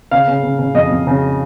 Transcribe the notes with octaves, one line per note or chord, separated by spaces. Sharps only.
C#3 F5
C#3
C#3
C#3
F2 D#5
F2
C#3